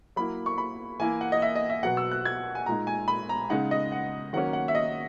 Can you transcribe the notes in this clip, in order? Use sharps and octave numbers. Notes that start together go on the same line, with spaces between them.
F#3 A#3 E4 B5
C#6
B5
E3 A#3 E4 G#5
F#5
D#5
E5
D#5
E5
B2 F#3 B3 F#5
E6
F#6
G#6
G#5
A#2 G#3 D#4 A#5
G#5
B5
A#5
C#3 G#3 D#4 F#5
D#5
F#5
D#3 F#3 A#3 C#4 F#5
F#5
E5
D#5